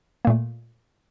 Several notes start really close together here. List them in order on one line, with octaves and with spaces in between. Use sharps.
A#3 A#2 A3